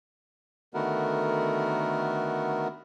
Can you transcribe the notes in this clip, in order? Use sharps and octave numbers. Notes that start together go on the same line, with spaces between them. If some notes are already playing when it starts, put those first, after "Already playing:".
D3 D#3 A3 B3 F#4 A#4